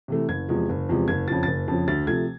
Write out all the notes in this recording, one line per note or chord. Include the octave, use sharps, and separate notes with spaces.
C3 E3 A3
F#1 G#6
E2 C3 F3 G#3
F#1
E2 C3 F3 G#3
F#1 G#6
F2 C#3 F3 A6
F#1 A6
F2 C#3 F3
D2 A6
C3 F3 A3 G#6